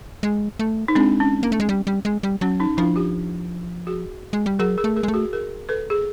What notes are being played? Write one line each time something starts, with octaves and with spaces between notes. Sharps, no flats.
G#3
A3
D#4
G#3 C4 D4
C#4
A#3
A3
G#3
G3
G3
G#3
G3
F#3 C#4
C#4 D#4
F3 D4 E4
F4 G4
F#4 G#4
G#3
G3
F#3 G#4 A#4
G#4 A#4
A3
G#4 A#4
G#3
A3
F#4 G#4
G#4 A#4
A4 B4
G#4